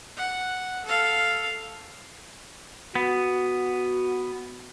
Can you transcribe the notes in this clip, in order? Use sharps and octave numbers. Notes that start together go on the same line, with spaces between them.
F#5
A4 F5
B3 F#4